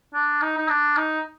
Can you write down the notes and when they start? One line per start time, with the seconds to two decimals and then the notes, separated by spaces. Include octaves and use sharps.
0.14 D4
0.42 D#4
0.58 D#4
0.69 D4
0.97 D#4